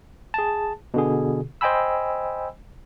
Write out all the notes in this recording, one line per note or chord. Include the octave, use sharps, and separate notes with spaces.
G#4 A5
B2 D3 G#4
C5 D#5 G5 G#5 B5 E6